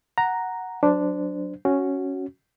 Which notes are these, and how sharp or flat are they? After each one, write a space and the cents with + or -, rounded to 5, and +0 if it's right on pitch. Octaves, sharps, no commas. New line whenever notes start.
F#5 +0 A#5 +0
F#3 +0 D4 +0 C5 -20
C#4 +0 F#4 +5